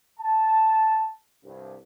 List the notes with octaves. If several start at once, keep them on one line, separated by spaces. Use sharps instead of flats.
A5
C2 G2